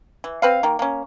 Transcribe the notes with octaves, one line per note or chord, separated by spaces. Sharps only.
E3
C4 B4 F5
D#3 A#3
A#3 C#4